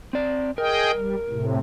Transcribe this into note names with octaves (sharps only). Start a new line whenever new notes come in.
C4 D5
G#4 A#4 D#5 G5
G3
A2 C3